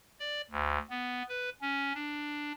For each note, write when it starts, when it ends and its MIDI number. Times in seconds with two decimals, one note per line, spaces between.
0.20 0.42 74
0.51 0.78 38
0.90 1.23 59
1.28 1.49 71
1.62 1.93 61
1.94 2.52 62